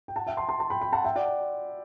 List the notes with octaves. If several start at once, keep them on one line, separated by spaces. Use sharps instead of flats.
G5
F#5 A5
E5 G5
A5 C6
A5 C6
A5 C6
G5 B5
G5 B5
F#5 A5
E5 G5
D5 F#5